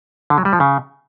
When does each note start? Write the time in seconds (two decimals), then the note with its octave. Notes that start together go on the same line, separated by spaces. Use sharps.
0.30 D3
0.38 F#3
0.45 G3
0.53 F3
0.60 C#3